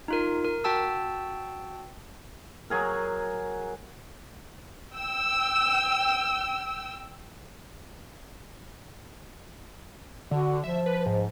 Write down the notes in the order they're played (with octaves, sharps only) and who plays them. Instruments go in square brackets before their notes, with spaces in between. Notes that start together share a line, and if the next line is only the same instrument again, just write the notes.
[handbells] D#4 F4 A#4
A#4
F#4 G5 A5 E6
[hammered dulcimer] F#3 G#4 A#4
[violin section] G5 E6
[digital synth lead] D3 [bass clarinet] F#4
[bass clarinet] F3 [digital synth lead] E5
[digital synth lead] B4
G#2